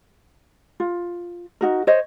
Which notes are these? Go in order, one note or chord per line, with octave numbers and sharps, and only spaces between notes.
F4
D#4 F#4 A#4
C5 C#5 D#5